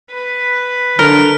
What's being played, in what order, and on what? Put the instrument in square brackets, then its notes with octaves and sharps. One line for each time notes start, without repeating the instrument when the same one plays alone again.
[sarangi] B4
[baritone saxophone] D3 [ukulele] A#4 [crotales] F6